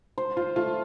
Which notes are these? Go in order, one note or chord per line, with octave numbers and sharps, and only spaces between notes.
C5
F4 C5
A3 F4